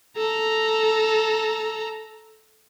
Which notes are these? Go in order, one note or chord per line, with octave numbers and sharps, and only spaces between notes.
A4 A#5